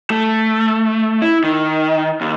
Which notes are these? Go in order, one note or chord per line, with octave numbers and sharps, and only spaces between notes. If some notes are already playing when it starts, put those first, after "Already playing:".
A3
E4
D#3
D#2